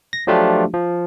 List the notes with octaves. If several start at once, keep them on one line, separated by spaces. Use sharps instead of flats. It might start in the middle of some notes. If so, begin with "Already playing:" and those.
A#6
F3 F#3 A3 D4 F4 G4
F3